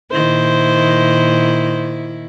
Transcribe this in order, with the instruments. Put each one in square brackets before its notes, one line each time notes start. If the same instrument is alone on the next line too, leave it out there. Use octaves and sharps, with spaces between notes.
[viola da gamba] A#2 D#3 E4 [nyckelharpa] C5